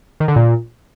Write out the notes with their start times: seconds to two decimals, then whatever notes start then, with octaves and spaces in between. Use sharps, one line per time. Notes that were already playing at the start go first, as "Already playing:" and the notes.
0.20 D#3
0.28 D3
0.36 A#2